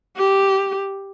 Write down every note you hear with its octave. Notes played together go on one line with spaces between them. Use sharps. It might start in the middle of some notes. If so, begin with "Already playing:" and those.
G4